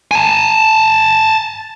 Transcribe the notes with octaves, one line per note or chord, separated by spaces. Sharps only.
G#5 A5